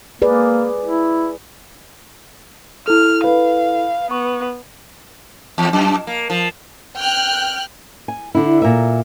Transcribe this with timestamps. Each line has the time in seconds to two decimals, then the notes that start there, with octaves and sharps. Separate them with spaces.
0.22 A#3 G#4 B4 D5
0.85 E4
2.88 E4 A4 F6
3.24 B4 F5
4.11 B3 C#6
5.58 E2
5.73 F#2
6.07 A#3
6.30 F3
6.99 G5 F6 F#6
8.08 G#5
8.35 D3 D4 E4
8.62 A#2 A#4 E5